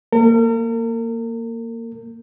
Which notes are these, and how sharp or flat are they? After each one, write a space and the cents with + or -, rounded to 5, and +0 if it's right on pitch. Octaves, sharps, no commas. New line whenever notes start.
A#3 -10 A#4 -40